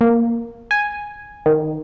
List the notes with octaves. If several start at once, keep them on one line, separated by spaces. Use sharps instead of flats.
A#3
G#5
D#3